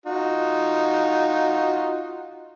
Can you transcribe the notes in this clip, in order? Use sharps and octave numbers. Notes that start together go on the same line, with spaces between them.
D#4 F4 F#4